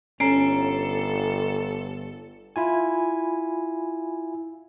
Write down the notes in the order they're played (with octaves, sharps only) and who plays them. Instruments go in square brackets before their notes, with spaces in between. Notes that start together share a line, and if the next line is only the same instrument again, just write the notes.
[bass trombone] G1 [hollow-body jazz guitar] C#4 [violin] A4 [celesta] A#5 C7 D7
[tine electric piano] E4 F4 G#5